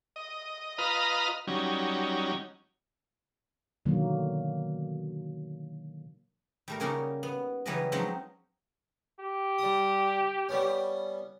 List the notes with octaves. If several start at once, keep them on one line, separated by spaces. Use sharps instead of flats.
D#5
F4 B4 D#5 A#5 D#6 F6
F#3 G3 C#4 D#4
B2 D3 D#3 F#3 A#3
G3 A3 A#4
C#3 G3 A#3 C#4 D#4 F#4
B3
C#3 E3 F#3 G3 B4 D#5
F3 F#3 G#3 C4 C#4 D#4
G4
G3 D#6
G3 B3 C#4